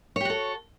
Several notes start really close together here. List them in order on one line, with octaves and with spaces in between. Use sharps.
C#5 G4 F#4 A4